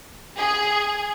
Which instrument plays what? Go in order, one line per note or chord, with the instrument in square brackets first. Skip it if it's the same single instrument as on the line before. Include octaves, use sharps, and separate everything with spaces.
[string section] G#4